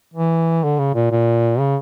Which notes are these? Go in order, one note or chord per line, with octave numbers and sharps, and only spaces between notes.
E3
D3
C#3
A#2
A#2
C#3